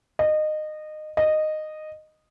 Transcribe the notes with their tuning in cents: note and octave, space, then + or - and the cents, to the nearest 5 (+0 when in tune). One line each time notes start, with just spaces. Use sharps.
D#5 -20
D#5 -10